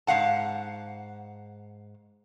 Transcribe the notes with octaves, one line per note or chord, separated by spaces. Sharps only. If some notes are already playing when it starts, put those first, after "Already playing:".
G#2 A3 F5 F#5 A5